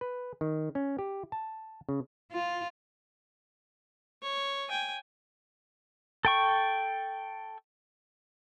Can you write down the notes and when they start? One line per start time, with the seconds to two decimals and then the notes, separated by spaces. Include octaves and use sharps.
0.01 B4
0.41 D#3
0.75 C#4
0.99 G4
1.32 A5
1.89 C#3
2.32 F4
4.23 C#5
4.69 G5 G#5
6.25 A4 G5 C#6